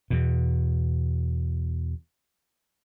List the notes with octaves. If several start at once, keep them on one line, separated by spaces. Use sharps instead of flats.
E2 B2